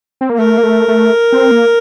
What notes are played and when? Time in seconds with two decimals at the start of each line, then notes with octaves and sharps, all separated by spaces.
0.21 C4
0.30 A#3
0.38 A3 A#4
0.58 A#3
0.63 A3
0.88 A3
1.32 C4
1.51 A#3